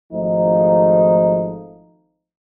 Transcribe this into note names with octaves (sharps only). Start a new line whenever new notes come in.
G#1 F3 A3 D#4